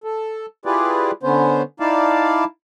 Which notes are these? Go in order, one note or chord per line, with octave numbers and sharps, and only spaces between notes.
A4
E4 F4 G4 G#4 B4 D5
D3 B3 C#4 C5
D#4 E4 D5 F5 A5